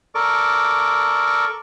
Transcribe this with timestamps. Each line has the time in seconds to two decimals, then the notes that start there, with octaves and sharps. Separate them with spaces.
0.15 A4 A#4 D5 C#6 D6